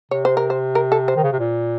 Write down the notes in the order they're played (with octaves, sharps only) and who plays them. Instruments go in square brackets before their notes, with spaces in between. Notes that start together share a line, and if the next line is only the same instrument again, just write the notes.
[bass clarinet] C3 [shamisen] C#5
[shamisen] C5
A#4
C5
A#4
A4
C5
[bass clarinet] D#3
C#3
C3
A#2